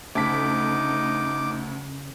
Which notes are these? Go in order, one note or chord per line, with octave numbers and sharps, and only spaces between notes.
D2 C#3 D#4 A5 D6 B6